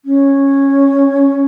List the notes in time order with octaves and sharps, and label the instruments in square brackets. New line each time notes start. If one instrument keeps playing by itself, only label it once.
[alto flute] C#4